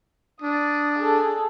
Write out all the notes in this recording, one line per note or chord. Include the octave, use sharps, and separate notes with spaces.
D4 D#6
G#4 A4